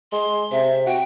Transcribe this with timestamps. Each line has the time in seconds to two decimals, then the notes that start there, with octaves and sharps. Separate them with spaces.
0.12 G#3 C6
0.51 C3 E5
0.86 F#4 G5